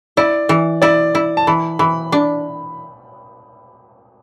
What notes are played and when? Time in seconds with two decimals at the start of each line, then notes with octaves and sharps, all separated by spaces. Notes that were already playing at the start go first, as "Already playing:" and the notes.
0.17 E4 D5
0.49 E3
0.82 E4 D5
1.15 E4
1.37 A5
1.47 E3 B5
1.79 E3 B5
2.12 D4